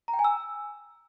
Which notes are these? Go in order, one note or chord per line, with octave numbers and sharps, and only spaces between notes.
A#5
G5
G#5
E6